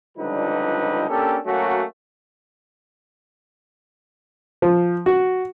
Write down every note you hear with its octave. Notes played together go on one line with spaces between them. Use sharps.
C#2 D3 F3 G3 D#4 B4
A#3 C#4 D4 G4 A4
F#3 A3 A#3 C#4 F#4
F3
F#4